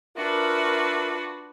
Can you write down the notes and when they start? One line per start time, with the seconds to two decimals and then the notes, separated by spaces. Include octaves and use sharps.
0.16 D4 F4 F#4 A#4 B4 E5